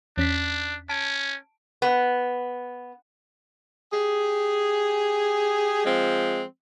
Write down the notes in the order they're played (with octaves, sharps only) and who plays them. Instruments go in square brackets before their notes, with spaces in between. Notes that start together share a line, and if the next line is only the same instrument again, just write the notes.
[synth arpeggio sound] E2 C#4 B6 [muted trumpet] D4
[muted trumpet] C#4 [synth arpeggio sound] A5 D7
[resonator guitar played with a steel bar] B3
[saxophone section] G4 G#4
F3 G#3 C4